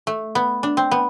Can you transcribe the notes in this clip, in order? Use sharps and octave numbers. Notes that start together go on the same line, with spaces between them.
A3
B3
D4
C4
B3